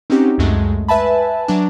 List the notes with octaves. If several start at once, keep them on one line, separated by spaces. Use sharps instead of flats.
C4 C#4 D#4 F#4 G4
C#2 F#2 G#3 A3
B4 E5 G#5 A5 B5
F#3 D4